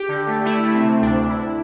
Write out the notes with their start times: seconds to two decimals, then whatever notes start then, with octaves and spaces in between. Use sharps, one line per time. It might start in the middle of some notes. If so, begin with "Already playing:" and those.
Already playing: G4
0.08 D3
0.27 A3
0.45 A3 E4
0.64 A3
0.74 C4
0.82 C3
1.01 D2 D4
1.20 D2
1.29 E4